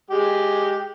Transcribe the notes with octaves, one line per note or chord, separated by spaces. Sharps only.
G#3 G4